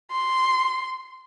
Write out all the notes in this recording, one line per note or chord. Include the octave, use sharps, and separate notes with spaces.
C6